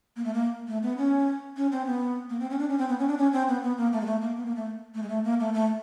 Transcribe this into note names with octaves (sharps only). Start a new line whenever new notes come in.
A#3
A3
A#3
A3
B3
C#4
C#4
C4
B3
A#3
C4
C#4
D4
C#4
C4
B3
C#4
D4
C#4
C4
B3
B3
A#3
A3
G#3
A3
A#3
B3
A#3
A3
A3
G#3
A3
A#3
A3
A3